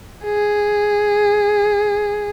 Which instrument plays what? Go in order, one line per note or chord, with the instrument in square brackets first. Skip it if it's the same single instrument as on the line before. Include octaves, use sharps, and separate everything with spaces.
[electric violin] G#4